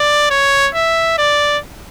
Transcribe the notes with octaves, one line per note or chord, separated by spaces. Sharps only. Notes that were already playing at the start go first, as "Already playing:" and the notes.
Already playing: D5
C#5
E5
D5